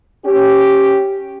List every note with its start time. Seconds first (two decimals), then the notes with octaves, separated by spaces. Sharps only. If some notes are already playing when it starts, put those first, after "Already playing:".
0.24 C#4 G4